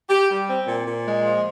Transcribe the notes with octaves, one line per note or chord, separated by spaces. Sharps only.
G4
G3
C4
A#2
A#2
G#3
F3